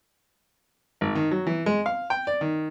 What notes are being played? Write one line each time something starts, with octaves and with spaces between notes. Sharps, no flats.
G#1
D#3
F#3
E3
G#3
F5
G5
D5
D#3